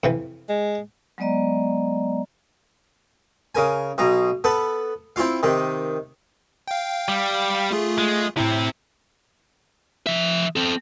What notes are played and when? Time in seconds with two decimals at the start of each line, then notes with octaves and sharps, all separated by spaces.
0.04 F2 C3 E3
0.49 G#3
1.18 F#3 G#3 B3 D5 D#5 A#5
3.55 C#3 A#4 G#5
3.98 B1 B2 A#5
4.44 B3 A4 B4
5.16 C4 E4 F4 F5
5.43 C3 D#3
6.68 F5 G5
7.08 G3
7.71 A3 F4 G#4
7.98 G#3
8.37 A2 C3 C4 E4
10.07 F3 E5
10.56 C4 A4